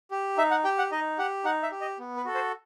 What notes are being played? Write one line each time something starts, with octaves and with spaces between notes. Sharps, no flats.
G4
D#4 E5
F#5
G4 G5
F#5
D#4 D#5
G4 F#5
D#4 F#5
E5
G4
D#5
B3
B4
F#4 A4
C5